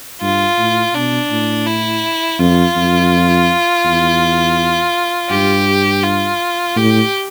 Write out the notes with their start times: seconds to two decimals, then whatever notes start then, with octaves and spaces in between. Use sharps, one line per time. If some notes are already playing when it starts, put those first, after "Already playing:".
0.21 G2 F4
0.58 A2
0.94 B2 D4
1.30 A2
1.66 E4
2.39 F2 F4
2.76 F2
3.85 E2
5.30 G2 G4
6.03 F4
6.76 A2 G4